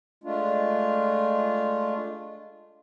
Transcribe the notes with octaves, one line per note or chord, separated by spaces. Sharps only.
G#3 A3 D4 F4